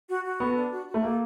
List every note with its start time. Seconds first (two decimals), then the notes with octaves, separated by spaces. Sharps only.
0.10 F#4
0.24 F#4
0.40 B3 A4
0.56 D4
0.72 F#4
0.87 F#4
0.94 A3
1.03 A#3 A4